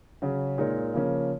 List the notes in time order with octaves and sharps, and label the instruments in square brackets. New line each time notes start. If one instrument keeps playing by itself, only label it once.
[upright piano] C#3 F#3 C#4
A#2 G#3 D#4 A#4 C#5
C#3 F3 A#3 C#4